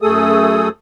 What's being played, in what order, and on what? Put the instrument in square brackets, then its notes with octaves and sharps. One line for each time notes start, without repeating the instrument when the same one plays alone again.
[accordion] F#2 A3 G#4 A4 D#6